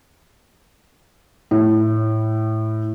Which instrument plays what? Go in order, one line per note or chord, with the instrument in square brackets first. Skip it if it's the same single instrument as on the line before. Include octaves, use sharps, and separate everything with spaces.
[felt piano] A2